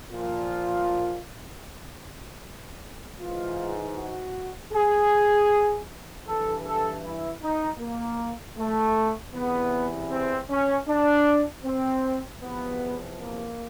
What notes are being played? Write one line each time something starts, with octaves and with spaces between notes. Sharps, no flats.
A#2 F3 F4
G#2 E3 F4
F#4
G#4
G2 E3 A4
A4
E4
D#4
A#3
A3
E2 C3 E3 B3
C4
C#4
D4
C4
E2 C3 F3 B3
A#3